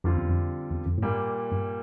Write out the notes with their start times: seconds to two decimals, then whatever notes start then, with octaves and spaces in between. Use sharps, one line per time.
0.04 F2 D3 G3 C4 F4
0.17 E2
0.29 F2
0.70 E2
0.86 F2
0.98 A2
1.02 G2 A#2 G3 A#3
1.52 G2